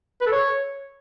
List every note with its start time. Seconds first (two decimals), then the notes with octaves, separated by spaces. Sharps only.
0.21 B4
0.27 A4
0.32 C#5